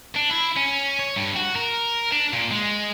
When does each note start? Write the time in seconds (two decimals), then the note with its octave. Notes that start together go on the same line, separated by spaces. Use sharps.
0.16 D4
0.31 E4
0.57 C#4
0.99 C#5
1.16 G2
1.36 F#4
1.56 A#4
2.12 D4
2.33 A#2
2.51 G#3